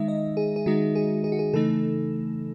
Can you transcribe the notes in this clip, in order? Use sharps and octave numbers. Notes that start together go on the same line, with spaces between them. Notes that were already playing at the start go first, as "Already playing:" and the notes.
Already playing: D#3 G#3 D#4 E5
D#5
G#4
G#4
D#3 G#3 D#4 F#4
G#4
G#4
F#4
G#4
C#3 E3 A3 D#4 A4